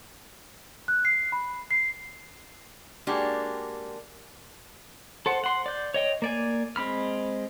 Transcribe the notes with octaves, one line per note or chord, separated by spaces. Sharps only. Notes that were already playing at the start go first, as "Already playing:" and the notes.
F#6
C7
B5
C7
G#3 A#3 D4 F#4 G4
A4 C5 F#5
F#5 C6
D5 G6
C#5 D#5 G5
A#3 D5 G#5
G#3 C4 B5 F6